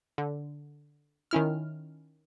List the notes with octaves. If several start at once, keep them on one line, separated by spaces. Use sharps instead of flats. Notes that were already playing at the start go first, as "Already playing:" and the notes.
D3
D#3 C#4 E4 F6